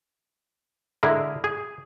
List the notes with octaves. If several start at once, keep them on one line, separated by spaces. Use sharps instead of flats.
D3 G#3 E4 G#4 A#4
G#4